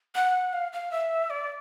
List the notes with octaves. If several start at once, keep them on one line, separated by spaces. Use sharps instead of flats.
F#5
F5
F5
E5
D5